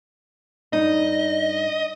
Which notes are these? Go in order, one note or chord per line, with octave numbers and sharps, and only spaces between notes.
G2 D#4 D#5